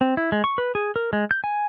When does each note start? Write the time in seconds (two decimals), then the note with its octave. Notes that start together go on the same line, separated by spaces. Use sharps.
0.01 C4
0.17 E4
0.32 G#3
0.44 C#6
0.58 B4
0.75 G#4
0.96 A#4
1.13 G#3
1.31 G6
1.44 G#5